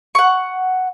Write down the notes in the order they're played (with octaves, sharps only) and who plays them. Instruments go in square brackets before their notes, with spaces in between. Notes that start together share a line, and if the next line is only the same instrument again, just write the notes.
[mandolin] F#5 C#6